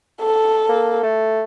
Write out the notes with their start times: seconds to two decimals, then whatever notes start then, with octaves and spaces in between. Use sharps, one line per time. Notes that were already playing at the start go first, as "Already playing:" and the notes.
0.21 A4
0.69 A#3
1.03 A3